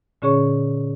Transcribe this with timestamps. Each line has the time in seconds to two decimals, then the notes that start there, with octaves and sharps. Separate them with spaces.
0.22 A#2 D3 C#4 G#4 C#5 C#6